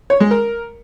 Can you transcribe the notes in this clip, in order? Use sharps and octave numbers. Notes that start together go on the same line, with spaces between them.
C#5
G#3
A#4